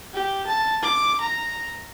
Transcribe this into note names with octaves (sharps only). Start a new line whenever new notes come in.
G4
A5
D6
A#5